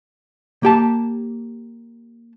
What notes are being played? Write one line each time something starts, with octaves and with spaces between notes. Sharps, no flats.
A#3 G4 A5